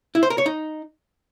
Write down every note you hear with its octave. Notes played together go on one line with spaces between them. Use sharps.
E4
C5
A#4
C#5
D#4